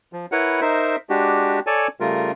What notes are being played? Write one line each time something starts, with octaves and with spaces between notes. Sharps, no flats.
F3
E4 A#4 B4 C#5 F#5
D#4 A#4 C5 E5
G#3 D4 F#4 G4
A4 C#5 D5 G#5 A5
C#3 G3 A3 F4 A#4